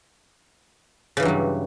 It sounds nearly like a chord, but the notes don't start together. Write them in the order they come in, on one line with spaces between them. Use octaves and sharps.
C#3 E3 G2 F#3 G3